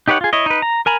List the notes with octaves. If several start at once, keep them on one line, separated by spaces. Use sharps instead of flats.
D#4 G4 B4 C#5 F#5
F4 G#4
E4 C#5 D#5
D#4 B4
A#5
A#4 G#5 A#5 B5